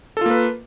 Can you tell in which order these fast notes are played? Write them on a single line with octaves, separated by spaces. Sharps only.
A4 F4 A#3 B4